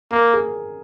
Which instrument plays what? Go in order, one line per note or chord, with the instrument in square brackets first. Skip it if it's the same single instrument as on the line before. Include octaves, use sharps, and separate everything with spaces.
[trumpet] A#3 [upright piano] A#4
[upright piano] G#4